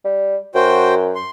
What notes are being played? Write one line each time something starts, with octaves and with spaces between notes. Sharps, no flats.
G3
F#2 F#4 C5 G5
C6